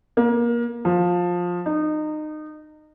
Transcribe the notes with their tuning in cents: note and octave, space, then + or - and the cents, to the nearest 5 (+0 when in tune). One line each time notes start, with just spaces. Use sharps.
A#3 +25
F3 +15
D#4 -25